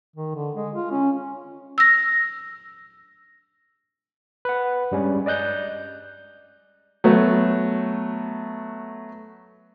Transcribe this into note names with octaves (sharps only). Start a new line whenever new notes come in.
D#3
D3
G#3
F4
C#4
E6 A#6
B4 F#5
G2 G3 G#3 C#4
D5 D#5 F#6 G6
F#3 A3 B3